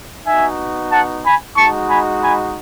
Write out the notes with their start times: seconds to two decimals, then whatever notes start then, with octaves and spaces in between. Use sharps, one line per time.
0.25 B3 D#4 F#4 E5 G#5
0.90 F#5 A5
1.24 G#5 B5
1.56 G#3 D#4 F#4 A5 C#6
1.89 G#5 B5
2.22 G#5 B5